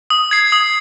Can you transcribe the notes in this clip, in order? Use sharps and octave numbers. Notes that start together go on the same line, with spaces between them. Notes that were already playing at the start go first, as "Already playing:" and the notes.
D#6
G#6 C7
D#6